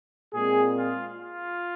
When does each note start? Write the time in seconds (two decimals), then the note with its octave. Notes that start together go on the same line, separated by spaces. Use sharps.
0.33 A#2 G#3 C4 G#4
0.77 F4
1.19 F4